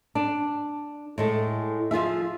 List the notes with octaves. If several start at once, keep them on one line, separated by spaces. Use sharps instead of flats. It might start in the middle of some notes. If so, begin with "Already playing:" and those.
D4
A2 G#3 A3
F3 F4 G#4 E5